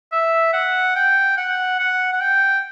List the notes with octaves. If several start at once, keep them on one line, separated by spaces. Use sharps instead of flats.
E5
F#5
G5
F#5
F#5
F#5
G5